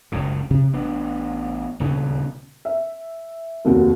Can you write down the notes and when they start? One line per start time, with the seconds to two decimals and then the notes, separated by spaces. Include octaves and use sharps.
0.12 F#1 C#2 A2 C#3
0.50 C3
0.73 A1 B3 D4
1.80 D#1 D2 C#3 B3
2.65 E5
3.65 F1 D#2 F#4